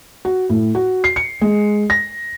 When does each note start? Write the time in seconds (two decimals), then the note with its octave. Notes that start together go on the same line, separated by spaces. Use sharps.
0.25 F#4
0.49 A2
0.75 F#4
1.04 C7
1.16 C#7
1.41 G#3
1.90 A#6